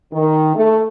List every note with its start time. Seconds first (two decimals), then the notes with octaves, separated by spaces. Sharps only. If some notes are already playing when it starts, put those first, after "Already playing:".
0.12 D#3
0.56 A3